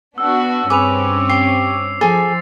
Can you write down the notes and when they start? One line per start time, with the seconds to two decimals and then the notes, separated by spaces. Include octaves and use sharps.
0.18 B3 D4 F#4 E6
0.70 G2 C4 C#4 G#4 B4 D6 F7
1.29 G4 C7
2.01 F3 G#4 A4 G#5 A6